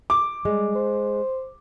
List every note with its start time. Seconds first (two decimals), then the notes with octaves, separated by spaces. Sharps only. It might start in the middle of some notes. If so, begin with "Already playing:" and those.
0.10 D6
0.45 G3 G#3
0.75 C5